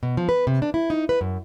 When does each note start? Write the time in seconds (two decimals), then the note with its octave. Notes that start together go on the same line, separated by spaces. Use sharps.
0.03 B2
0.17 F3
0.29 B4
0.47 C3
0.62 D4
0.74 E4
0.90 D#4
1.09 B4
1.21 F#2